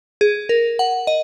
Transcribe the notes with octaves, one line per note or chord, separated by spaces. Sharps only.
G#4
A#4
F#5
D#5